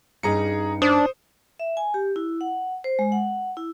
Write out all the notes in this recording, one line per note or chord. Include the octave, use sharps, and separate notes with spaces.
G2 C#4 D#4 G#4 A#5 C#7
D4 C5 D#6
E5
G#5
G4
E4
F#5
C5
G#3
F#5
E4